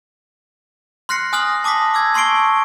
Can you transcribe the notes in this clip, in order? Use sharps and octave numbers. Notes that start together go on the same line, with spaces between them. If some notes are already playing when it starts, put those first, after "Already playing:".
C6 F6 F#6 A#6 C7 C#7
G#5 D#6 F6 F#6 A#6 F#7
A5 D6 D#6 A#6 B6
D6 E6 G#6
A5 C6 C#6 C7 D7 G7